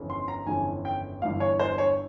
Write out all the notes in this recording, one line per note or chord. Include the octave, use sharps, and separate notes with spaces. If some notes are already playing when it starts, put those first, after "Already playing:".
Already playing: G1 F2 C#3 E3
C6
A#5
G1 F2 C#3 E3 G#5
G5
G1 G2 E3 F5
C#5
C5
C#5